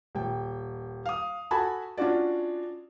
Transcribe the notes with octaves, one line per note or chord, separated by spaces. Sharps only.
D#1 G5
F5 D#6
F#4 A4 G#5 A5 B5
C#4 D4 F4 F#4 D5